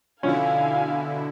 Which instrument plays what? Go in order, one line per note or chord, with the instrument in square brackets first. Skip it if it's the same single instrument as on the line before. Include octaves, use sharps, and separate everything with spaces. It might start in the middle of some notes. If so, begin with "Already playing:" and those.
[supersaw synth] B2 D3 E4 [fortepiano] F3 C#4 [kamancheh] F5 G#5